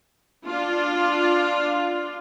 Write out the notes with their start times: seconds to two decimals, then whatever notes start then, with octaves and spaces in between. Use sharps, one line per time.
0.47 D4 F4